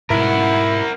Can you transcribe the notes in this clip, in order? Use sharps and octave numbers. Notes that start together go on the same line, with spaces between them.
G#2 B2 E4 A#4 F#5